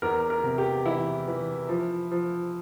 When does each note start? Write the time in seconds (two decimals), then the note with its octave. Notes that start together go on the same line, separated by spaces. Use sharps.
0.02 E2 A#4
0.30 A#4
0.44 C3
0.58 G4
0.85 E3 E4
1.28 E3
1.69 F3
2.11 F3